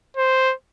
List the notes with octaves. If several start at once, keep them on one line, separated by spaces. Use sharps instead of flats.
C5